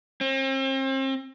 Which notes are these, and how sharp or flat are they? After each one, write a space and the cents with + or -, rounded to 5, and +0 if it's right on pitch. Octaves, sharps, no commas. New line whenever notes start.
C4 +40